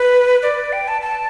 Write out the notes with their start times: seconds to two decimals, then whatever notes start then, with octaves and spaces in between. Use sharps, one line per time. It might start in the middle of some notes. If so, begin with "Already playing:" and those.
Already playing: B4
0.43 D5
0.73 G5
0.88 A5
1.02 A5